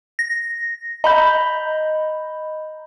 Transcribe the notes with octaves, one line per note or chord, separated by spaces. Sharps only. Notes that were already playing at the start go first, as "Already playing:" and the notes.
A#6
D#5 A#5 B5 G6